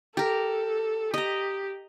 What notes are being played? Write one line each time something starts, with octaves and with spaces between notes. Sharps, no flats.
G4 A4 A#4
G4 D#5 A#5